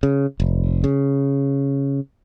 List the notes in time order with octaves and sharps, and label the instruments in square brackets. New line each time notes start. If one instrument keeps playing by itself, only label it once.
[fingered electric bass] C#3
F1
C#3